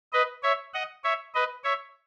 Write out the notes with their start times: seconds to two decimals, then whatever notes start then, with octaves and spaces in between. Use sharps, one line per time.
0.13 B4 D#5
0.43 C#5 E5
0.74 D#5 F#5
1.04 C#5 E5
1.34 B4 D#5
1.64 C#5 E5